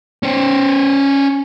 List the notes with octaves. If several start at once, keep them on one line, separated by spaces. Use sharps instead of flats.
C#4 C5